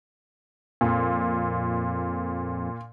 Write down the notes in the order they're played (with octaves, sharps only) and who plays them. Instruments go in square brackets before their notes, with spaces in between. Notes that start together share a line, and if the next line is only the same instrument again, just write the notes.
[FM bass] F2 [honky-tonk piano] A#2